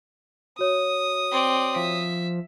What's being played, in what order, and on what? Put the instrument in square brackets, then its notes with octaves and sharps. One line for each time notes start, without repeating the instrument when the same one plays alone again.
[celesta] F#4 C#5 [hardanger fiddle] D#6
[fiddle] C4 D5
[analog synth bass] F3 [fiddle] E5